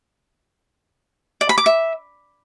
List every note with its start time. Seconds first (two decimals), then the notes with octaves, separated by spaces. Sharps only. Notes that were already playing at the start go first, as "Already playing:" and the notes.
1.41 D5
1.49 B5
1.58 D6
1.66 E5